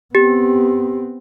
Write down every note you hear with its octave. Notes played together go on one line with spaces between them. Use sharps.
B3 C4 G4